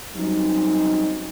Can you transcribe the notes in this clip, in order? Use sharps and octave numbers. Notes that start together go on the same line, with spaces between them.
F#3 G3 C4 C#4 D#4